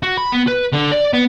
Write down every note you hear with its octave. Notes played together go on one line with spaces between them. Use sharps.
F#4
B5
B3
B4
D3
D5
B3